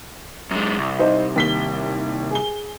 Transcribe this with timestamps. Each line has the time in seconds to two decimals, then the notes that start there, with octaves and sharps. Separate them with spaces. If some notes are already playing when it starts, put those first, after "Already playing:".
0.51 F#2 G#3
0.78 C2
0.99 D#4 C5
1.36 D#2 B6 G7
2.31 G#4 G7